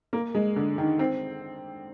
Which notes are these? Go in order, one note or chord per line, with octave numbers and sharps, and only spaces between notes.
A#3
G#3
D3
D#3
C4